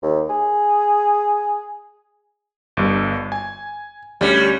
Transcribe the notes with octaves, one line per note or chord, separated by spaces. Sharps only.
D#2
G#4
G1 G2
G#5
D2 G3 C#4